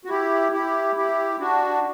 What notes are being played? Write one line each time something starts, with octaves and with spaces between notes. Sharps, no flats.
F#4
E4 G4
E4 G4
E4 G4
D4 F#4